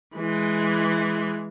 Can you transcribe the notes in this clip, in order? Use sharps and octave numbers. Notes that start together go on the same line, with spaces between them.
E3 G#3